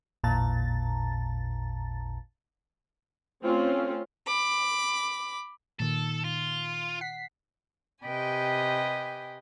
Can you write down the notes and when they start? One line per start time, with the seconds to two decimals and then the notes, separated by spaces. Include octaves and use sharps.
0.24 A1 E2 A#2 A5 A#5 A6
3.44 A3 C4 C#4 F4
4.27 B5 D6
5.80 A#2 D#3 A4
6.24 F4
7.01 F#5 B6 C7
8.04 C3 G4 B4 D#5 G5 G#5